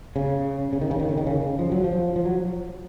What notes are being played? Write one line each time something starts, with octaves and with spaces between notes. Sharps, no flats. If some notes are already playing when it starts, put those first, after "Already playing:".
C#3
C#3
D#3
C#3
D#3
C#3
D#3
C#3
F3
F#3
F3
F3
F#3